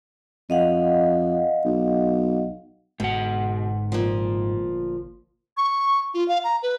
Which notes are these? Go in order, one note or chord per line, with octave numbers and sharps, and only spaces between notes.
F2 D#5 F5 F#5
B1
G1 G#2 B2 F#5
A#2 F3
C#6
F4
F5
A#5
B4